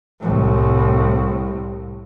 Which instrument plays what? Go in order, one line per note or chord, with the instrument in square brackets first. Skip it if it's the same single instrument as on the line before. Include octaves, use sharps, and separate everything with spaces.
[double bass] C2 A2